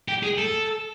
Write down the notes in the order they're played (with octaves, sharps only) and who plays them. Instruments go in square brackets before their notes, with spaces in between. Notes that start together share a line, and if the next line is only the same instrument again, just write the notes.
[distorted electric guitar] G4
G#4
A4